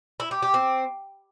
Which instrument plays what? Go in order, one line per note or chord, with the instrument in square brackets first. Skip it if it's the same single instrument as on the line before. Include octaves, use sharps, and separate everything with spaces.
[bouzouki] E4
G4
G4
C4